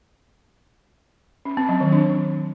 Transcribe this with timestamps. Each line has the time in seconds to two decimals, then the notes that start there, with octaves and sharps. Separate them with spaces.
1.45 C#4
1.57 C4
1.69 F#3
1.81 D#3
1.92 D4